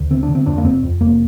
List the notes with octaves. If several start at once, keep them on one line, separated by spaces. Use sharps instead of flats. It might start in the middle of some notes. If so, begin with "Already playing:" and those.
Already playing: D2
D3 C4
D4
D3
C4
F2 D4
A#3
F1 C4
F2
F1 A#3